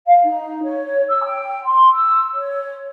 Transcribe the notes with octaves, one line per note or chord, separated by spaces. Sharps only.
F5
D#4
C#5
E6
G5
C6
E6
C#5